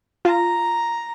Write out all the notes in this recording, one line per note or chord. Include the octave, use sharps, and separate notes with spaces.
F4 A#5